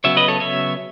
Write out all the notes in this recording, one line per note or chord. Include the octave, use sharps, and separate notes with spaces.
C#3 F#3 B3 C#5 E5
B4 D#5
A4 C#5
C#5 E5